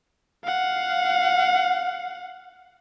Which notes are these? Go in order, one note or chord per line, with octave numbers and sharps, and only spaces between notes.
F5 F#5